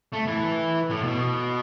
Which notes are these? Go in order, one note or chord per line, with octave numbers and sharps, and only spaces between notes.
A3
E3
A2
B2